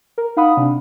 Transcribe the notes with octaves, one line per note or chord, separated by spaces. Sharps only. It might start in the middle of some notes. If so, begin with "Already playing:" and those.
A#4
D#4 F5 F#5 B5 D#6
C3 D4